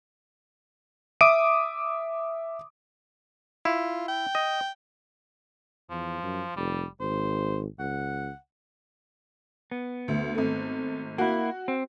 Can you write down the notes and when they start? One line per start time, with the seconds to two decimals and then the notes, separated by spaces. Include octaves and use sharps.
1.21 E5 D6 D#6 D7 D#7
3.65 E4 F4
4.08 G5
4.35 D#5
5.90 E2 F3
6.23 F#2
6.56 F1 G3
7.00 G#1 C5
7.79 C#2 F#5
9.72 B3
10.08 D2
10.35 G#1 A3
11.18 A#3 E4 F#4
11.68 C4